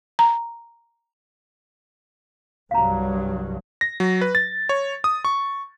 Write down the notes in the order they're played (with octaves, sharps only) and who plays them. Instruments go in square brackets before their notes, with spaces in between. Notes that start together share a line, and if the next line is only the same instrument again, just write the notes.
[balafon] A#5
[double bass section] C2 G2 F#3 [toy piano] F5 A#5
[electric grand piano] A#6
F#3
B4
A6
C#5
D#6
C#6